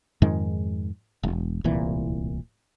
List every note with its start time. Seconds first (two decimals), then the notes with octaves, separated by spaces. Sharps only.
0.22 F2 G#2 D#3 G#3
1.23 E1
1.64 D1 C2 A#2 E3